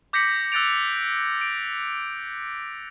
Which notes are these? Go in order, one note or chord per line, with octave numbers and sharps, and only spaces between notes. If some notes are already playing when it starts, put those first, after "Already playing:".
D6 G6 A#6 B6 C#7 F#7
E6 F#6 A6 D7 F7
D7